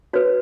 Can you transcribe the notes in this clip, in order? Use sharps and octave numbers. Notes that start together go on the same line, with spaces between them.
F#4 B4 C#5